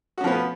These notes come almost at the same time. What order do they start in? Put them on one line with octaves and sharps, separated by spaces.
F#4 C#4 F3 B3